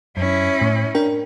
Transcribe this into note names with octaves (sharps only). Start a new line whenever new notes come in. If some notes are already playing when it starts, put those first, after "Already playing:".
F#2 C#4 E4
A2
D4 A#4 G5